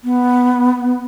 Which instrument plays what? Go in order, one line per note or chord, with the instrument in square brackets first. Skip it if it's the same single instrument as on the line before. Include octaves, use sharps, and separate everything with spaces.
[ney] B3